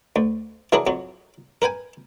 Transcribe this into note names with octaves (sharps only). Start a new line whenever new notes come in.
D2
E3 F#3 D4 G#4 A#4 B4
F2 F#3
A#4 B4 G5 G#5